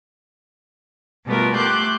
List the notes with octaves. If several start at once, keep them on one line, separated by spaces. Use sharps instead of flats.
B2 G3 A3 B3 F4 A#4
A3 G4 C6 D6 F#6 G6